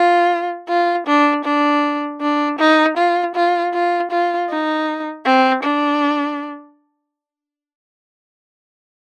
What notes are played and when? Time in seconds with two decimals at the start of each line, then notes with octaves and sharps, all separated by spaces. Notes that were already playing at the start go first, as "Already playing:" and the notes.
Already playing: F4
0.69 F4
1.07 D4
1.45 D4
2.22 D4
2.59 D#4
2.97 F4
3.35 F4
3.74 F4
4.11 F4
4.50 D#4
5.26 C4
5.64 D4